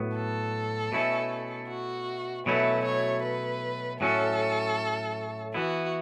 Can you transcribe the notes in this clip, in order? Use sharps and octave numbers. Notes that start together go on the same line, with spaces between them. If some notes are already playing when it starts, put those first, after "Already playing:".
Already playing: A2 F#3 B3
A4
B2 A3 C#4 E4
F#4
B2 F#3 A3 C#4 E4 B4
C#5
B4
A2 F#3 C#4 A4
E3 B3 E4 F#4